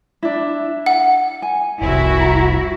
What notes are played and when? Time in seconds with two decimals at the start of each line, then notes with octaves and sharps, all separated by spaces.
0.23 D4 E4
0.86 F#5
1.42 G#5
1.82 F1 C2 E4 F#4
2.20 A#5